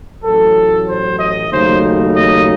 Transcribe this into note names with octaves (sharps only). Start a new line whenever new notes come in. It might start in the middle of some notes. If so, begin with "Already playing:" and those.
A1 A2 F#3 A4
C5
D#5
D#2 C#3 F#3 A3 D#4 C5
D#5